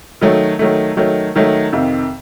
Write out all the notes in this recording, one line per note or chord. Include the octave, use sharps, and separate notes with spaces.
D#3 F#3 A3
D#3 F#3 A3
D#3 F#3 A3
D#3 F#3 A3
F2 C3 D#3